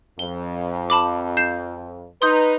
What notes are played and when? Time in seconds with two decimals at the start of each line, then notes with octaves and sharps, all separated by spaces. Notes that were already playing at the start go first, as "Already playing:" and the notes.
0.19 F2 G7
0.90 A5 B5 D6
1.37 G6 C7 E7
2.22 D#4 B4 C6 D#6 G6